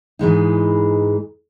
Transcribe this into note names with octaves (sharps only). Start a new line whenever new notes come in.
G#2 E3 G#3 D#4